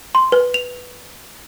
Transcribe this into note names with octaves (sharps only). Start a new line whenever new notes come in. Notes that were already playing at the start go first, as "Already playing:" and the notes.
C6
B4
F7